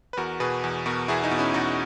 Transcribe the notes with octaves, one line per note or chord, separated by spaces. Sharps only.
B4
E2 F#4 A#4
B2 G#4 B4
E2
B2 F#4 A#4
E2 E4 G#4
D#4 F#4
B2
C#4 E4
E2 D#4 F#4